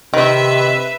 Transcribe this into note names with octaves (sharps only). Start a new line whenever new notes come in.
C3 D#3 B4 E5